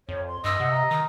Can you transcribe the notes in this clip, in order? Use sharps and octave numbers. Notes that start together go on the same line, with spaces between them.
F2 C#5
C6
G2 D#5 C6 E6
C3 F#5
A#5
D#3 D#6